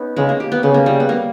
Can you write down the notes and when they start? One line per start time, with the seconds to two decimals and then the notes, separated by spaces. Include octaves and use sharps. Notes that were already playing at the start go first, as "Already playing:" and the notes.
Already playing: B3 C#4 D#4
0.16 C#3 G#3
0.29 A#3
0.40 G4
0.52 B3
0.63 C#3 B3
0.74 A#3
0.86 G3
1.00 B3
1.09 A#3